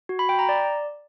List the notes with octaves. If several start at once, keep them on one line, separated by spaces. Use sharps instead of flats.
F#4
B5
G5
A#5
D5